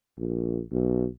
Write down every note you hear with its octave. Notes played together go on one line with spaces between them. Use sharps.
A#1
B1